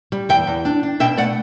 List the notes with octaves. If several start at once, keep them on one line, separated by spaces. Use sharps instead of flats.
G3
E2 E5 G5
E2
D4
D4
B2 E5 G5
A3 D5 F#5